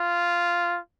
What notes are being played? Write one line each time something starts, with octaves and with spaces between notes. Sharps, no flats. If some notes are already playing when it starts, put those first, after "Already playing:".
Already playing: F4